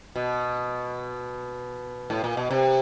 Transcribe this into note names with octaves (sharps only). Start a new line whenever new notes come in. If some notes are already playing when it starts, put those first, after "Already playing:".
B2
A2
A#2
B2
C3